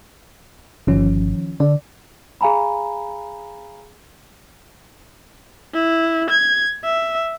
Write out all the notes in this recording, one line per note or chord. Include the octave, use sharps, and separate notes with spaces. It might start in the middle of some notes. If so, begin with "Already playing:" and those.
G1 D#3 F3 C#4
D3 D5
G#4 F5 G#5 A#5 B5
E4
G#6
E5